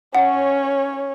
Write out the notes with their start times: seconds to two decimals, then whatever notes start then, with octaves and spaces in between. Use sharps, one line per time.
0.15 C#4 C#5 F#5